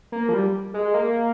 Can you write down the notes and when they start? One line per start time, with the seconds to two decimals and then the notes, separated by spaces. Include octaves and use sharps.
0.12 A#3
0.29 F3
0.34 G3
0.74 G#3
0.94 A#3